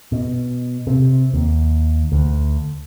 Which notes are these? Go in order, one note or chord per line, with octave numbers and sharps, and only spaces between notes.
B2
C3
D#2
D2